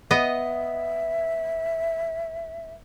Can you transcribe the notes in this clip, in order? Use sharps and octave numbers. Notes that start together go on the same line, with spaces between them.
B3 D#5 E5